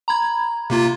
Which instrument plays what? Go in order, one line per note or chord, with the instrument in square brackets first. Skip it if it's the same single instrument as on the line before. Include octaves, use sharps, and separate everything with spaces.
[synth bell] A#5 B5 G#6
[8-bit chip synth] C3 A#3 F4